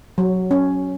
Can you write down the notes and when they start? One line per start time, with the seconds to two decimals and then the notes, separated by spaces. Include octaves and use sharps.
0.18 F#3
0.51 C#4